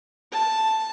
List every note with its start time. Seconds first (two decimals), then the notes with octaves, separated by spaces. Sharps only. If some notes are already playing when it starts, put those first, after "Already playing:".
0.32 A5